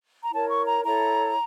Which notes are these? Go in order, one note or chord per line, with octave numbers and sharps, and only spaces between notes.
A#5
E4 A#4 C#5 A5
C#6
A#5
E4 A4 C#5 A#5